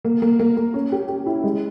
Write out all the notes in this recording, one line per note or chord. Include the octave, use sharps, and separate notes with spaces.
A#3
A#3
A#3
A#3
C#4
G4
G4
E4
G#3